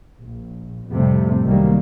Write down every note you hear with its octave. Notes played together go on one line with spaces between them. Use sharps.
A#1
F2 A2 C3 G3 A3
C2 D#3 F#3 G3 A#3